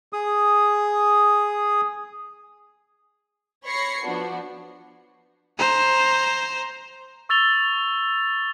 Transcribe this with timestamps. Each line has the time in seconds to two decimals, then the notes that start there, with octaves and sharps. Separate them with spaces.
0.13 G#4 D#6
3.65 C#5 B5 C#6 A#6 C7 C#7
4.03 F3 B3 D4 F#4
5.59 C5 A#5
7.29 C#6 E6 A6 F7 G7